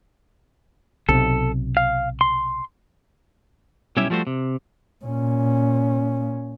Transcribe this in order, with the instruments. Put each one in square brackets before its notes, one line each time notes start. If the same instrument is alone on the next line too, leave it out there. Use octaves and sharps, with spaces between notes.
[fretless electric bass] B1 C3 [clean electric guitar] A4
[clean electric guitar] F5
C6
B1 G3 C#4 E4 G4 E5
F3 G3 A3 F#4 C5
C3
[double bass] A#2 C#4